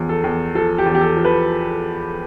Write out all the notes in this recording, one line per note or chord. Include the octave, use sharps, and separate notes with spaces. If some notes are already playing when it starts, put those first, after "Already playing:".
Already playing: E2 F3
A4
E2
F3 A4
G4
E2
G4
A4
F3
B4